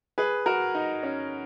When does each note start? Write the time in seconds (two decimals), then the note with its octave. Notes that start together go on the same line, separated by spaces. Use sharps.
0.18 G#4 B4
0.46 F#4 A#4
0.75 D#4
1.03 C#4